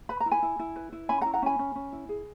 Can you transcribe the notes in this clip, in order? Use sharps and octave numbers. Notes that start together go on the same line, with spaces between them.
B4 B5
A#5
E4
G#5 B5
E4
E4
B4
E4
C#4 G#5 B5
F#5 A#5
E4
F#5 A#5
C#4 G#5 B5
C#4
C#4
E4
G#4